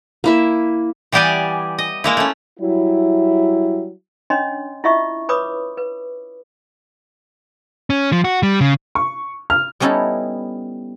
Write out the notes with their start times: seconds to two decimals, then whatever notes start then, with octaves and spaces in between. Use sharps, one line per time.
0.24 A#3 E4 E5
1.12 E3 G3 B3 G4 D5 G#5
1.78 D#5
2.04 G#3 A#3 E4
2.17 A3 C#4
2.60 F#3 G3 E4
4.30 C#4 D4 C#5 D#5 C6
4.84 E4 F4 D#5 E5 C#6
5.29 B4 C#5 B5 D6 D#6
5.77 B4
7.90 C#4
8.12 F3
8.24 F#4
8.43 G3
8.61 C#3
8.95 C#6
9.50 F6
9.80 G3 B3 C#4 D#4 E4 A4